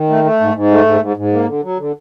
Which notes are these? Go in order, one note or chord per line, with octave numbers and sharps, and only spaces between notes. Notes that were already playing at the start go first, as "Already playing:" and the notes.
Already playing: D#3
A3
A3
G#2
G#2
A3
G#2
G#2
G#2
A#3
D3
F#3
D3